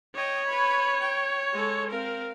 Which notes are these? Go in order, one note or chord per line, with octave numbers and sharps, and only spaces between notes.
C#5 D#5 G5
B4 B5
G5
G#3 A4
C4 A#4 F5